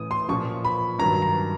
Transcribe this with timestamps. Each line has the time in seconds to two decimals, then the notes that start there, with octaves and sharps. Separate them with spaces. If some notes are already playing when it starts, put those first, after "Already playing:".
Already playing: A2 E3 D#6
0.11 C6
0.29 A#2 F3 C#6
0.65 B5
0.99 G2 D#3 F#3 A#5
1.22 A#5